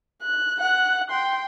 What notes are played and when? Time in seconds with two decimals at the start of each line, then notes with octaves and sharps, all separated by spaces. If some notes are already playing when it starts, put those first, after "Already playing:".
0.23 F#6
0.60 F#5 F#6
1.11 G5 C6